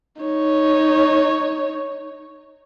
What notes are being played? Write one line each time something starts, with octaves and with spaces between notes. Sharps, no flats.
D#4 C#5